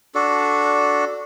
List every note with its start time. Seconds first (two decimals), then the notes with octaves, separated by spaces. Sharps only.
0.15 D4 F#4 A4